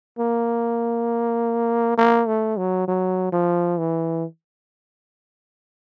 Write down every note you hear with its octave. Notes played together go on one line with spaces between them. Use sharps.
A#3
A#3
A3
F#3
F#3
F3
E3